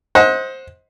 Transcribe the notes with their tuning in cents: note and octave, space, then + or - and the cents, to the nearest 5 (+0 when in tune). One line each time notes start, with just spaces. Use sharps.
C5 +10 D#5 +30 F#5 -20